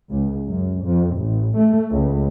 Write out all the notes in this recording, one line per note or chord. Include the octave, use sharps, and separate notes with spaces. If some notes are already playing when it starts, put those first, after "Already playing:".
C#2
F#2
F2
A1
A3
C#2